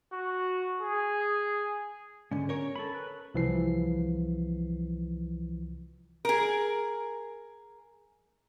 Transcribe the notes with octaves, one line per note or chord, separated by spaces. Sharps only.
F#4
G#4
G#2 D3 C#4
A#4 C#5
A4 B5
B4
C2 E3 F3 C7
G#4 A#4